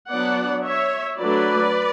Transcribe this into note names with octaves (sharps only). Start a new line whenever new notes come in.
F#3 B3 D4 D5 F#5
C#5 E5
F#3 A3 D4 B4 D5